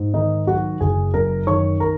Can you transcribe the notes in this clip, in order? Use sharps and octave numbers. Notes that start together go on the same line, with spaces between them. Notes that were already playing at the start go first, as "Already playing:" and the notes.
Already playing: G#2
D#3 D#4 D#5
F#3 F#4 F#5
F#1 G#4 G#5
F#2 A#4 A#5
D#3 C#5 C#6
A#4 A#5